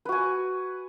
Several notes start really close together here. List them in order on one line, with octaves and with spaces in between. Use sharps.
B4 F#4 G#5